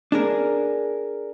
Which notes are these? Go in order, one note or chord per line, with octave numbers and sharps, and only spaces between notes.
D4 G#4 A#4